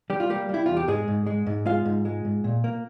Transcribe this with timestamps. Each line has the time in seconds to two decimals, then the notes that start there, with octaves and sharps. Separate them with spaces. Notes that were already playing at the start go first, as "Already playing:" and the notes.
0.10 G3 G4
0.20 F4
0.30 G3 A#3 G4
0.49 G3 E4
0.66 E2 F4
0.77 G4
0.88 G#2 G#3 G#4
1.08 G#2
1.26 G#3
1.46 G#2
1.66 G#3 F4 F5
1.85 G#2
2.05 G#3
2.25 G#2
2.44 A#2
2.64 A#3